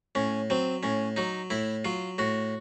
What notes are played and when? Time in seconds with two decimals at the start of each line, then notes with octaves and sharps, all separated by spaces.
0.15 A2 C#4
0.50 F#3 C4
0.83 A2 C#4
1.16 F#3 D#4
1.50 A2 E4
1.85 F#3 F4
2.18 A2 F#4